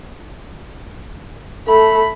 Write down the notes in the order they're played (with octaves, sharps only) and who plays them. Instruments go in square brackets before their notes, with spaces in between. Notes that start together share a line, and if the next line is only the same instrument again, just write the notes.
[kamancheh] A3 B5 [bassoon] A4